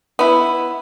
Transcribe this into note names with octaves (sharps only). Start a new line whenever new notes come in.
B3 E4